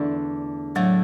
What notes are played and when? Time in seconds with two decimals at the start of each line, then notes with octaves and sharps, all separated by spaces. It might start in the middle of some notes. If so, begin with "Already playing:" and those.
Already playing: E2 D3 A3 D4
0.75 A2 F#3 A3 D4